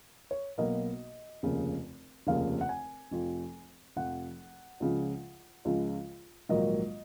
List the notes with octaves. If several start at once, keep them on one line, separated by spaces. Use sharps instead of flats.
C#5
B1 B2 A#3 D#5
F1 D#2 C#3
F1 D#2 C#3 F5
F#5
G#5
F1 F2 F3
F1 F2 F3 F#5
C#2 C#3 F3
C#2 C#3 F3
A#1 G#2 D#3 F#3 A#3 D#5